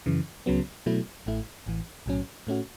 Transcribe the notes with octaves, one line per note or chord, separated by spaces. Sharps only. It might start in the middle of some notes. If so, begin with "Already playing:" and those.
F#2 C#3 E3
C#2 C#3 F#3 B3
B2 F#3 A3 E4
A1 A2 A3 E4
A1 A2 E3
B1 A2 F#3 C#4
A2 A3 C#4 F#4